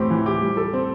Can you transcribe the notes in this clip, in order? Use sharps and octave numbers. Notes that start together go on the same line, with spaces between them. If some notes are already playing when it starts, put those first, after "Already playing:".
Already playing: A2 E3 C4 G4
E3
G4
G3
A4
C4